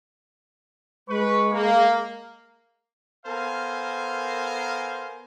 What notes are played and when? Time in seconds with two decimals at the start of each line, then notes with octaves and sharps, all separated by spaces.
1.08 G#3 B4 C#6
1.51 A#3
3.26 B3 A4 A#4 C5 F5 G#5